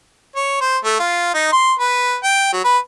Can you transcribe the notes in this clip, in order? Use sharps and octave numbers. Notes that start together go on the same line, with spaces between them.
C#5
C5
A3
F4
D#4
C6
B4
G5
F#3
B4